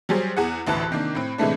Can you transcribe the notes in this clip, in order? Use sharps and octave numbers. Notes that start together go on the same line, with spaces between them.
F#3 G3 G#4 C5
E2 G#4 F#5
A1 D2 E3 A5 F#6
C3 D#3 A#3 D4
A2 C4
A2 C3 E3 G#3 A3 D4